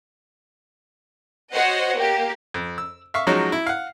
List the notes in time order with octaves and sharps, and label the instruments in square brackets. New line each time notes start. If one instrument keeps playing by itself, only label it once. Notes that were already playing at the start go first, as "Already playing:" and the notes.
[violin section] F#4 C5 C#5 D#5 F#5
A#3 G4
[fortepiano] F2
E6
E5 F5 C#6
F3 F#3 G#3 C#4 D#4 F#4
E4
F5 F#5